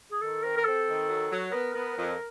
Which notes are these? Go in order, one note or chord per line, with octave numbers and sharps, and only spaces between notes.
G#4
D#3 A4
C4 A#4
A#4
C4 A4
D#3
F#3
F#3
B3 A#4
B3 A#4
F2